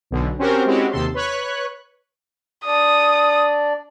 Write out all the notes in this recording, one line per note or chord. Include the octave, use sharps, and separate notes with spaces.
B1 B2 D3
C4 C#4 F#4 G4 A#4 C5
G#3 C4 C#4 E4 F#4 G4
D#2 C3 A4 C6
B4 C#5 C#6 F#6
D4 D5 D#6